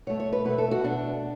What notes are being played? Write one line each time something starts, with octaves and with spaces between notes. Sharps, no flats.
B2 A3 C#5
C#5
B4
B2 A3 B4
A4
F#4
B2 A3 D4